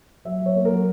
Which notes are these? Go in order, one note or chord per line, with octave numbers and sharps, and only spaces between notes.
F#3 E5
F#3 C#5
A#3
A#4
F#3